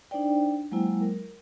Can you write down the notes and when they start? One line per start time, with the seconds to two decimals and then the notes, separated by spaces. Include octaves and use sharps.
0.11 D4 D#4 C5 D5 G5
0.72 F#3 G#3 A#3 E4 C5 G5
1.01 A#4